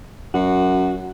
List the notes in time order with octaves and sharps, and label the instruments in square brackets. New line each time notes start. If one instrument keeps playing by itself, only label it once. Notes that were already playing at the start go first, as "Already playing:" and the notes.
[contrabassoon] F#2 [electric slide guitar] F#4